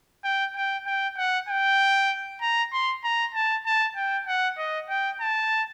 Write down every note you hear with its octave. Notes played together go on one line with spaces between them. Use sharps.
G5
G5
G5
F#5
G5
A#5
C6
A#5
A5
A5
G5
F#5
D#5
G5
A5